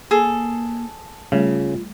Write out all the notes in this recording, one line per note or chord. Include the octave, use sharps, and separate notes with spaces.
A#3 G#4 A4
C#3 G3 A3 F4